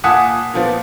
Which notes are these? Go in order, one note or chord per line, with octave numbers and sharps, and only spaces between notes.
A#2 F#5 G#5 A5 D#6 B6
A#2 F3 B3